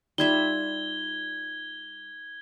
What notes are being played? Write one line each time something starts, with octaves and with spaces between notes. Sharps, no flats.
G3 D#4 F4 E5 G#6 G7